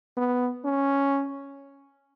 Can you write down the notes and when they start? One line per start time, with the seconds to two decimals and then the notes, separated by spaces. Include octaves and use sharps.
0.17 B3
0.65 C#4